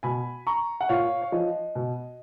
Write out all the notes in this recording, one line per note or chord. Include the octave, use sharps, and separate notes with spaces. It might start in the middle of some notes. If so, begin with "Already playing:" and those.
B2 G#5 B5
A#5 C#6
F#5
A#2 C#5 F5
C#5
F3 D#5
B2